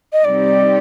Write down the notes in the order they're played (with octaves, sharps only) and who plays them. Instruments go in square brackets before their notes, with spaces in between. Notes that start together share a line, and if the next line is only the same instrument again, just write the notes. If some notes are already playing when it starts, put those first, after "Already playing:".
[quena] D#5
[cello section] C3 G3 C4 D#4 G4 [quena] D5